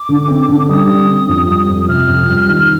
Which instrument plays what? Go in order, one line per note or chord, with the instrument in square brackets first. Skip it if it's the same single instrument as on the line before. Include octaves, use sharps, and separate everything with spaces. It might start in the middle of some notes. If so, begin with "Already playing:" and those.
Already playing: [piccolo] D6
[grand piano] D3
C4
D3
[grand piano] G3 [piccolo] D#6
[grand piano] D3
C4
F2
G3
F2
[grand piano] C3 [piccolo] F6
[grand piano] F2
G3
D#3